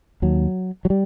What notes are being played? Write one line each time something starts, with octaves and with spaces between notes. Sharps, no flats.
D#2 F#3
F#3
G3